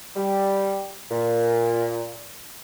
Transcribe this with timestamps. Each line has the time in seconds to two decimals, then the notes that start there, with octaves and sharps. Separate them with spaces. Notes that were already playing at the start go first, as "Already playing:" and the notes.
0.16 G3
1.11 A#2